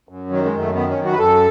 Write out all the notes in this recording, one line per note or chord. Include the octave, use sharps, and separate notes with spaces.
F#2
D#3 F#3
G#3
F#2
A3
D#3 B3
C#4
F#2
F#4
B4
F#2 A4